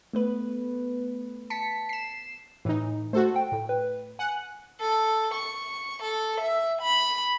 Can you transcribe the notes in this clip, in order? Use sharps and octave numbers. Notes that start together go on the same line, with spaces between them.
A3 B3 B4
A5 B6 C#7
C7 E7
A2 E3 D#4
A3 F#4 A4 C5
G5
A2
B4
F#5 G#5
A4
C#6
A4
E5
B5